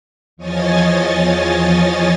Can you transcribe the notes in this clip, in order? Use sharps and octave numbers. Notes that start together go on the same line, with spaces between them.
E2 F3 C#5 D#5 G#5 A6